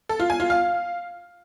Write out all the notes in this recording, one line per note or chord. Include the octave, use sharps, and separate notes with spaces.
A4
F4
G#5
F4
F5